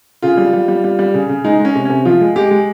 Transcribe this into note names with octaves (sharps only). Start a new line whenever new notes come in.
C#3 F4
G3
G3
G3
G3
G3
C#3
C#3
G#3 D#4
G#3
C#4
C3
C3 C#4
F3 F4
G#3
G#3 G4
G#3